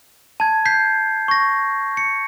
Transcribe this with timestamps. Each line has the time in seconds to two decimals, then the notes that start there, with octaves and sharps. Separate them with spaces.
0.40 A5 G#6
0.65 G6 B6 C7
1.28 C#6 A#6
1.97 C#7